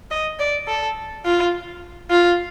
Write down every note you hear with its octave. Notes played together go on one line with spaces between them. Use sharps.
D#5
D5
A4
F4
F4